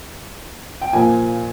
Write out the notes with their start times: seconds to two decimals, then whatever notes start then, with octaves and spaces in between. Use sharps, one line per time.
0.81 G5
0.93 A#2 F3 A#3 G#5